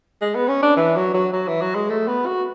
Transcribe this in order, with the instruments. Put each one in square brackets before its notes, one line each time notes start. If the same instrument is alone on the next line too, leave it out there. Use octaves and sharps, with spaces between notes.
[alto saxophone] G#3
B3
C#4
D4
E3
F#3
F#3
F#3
E3
F#3
G#3
A3
B3
F#4